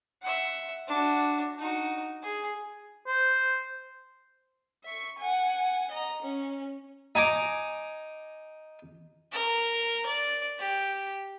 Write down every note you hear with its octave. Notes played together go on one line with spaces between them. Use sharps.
E5 F#5
D4 F#4
D#4 F#4
G#4
C5
E5 C#6
F#5 G#5
D#5 A#5
C#4
D#4 G#5 A#5 D6
A#4
D5
G4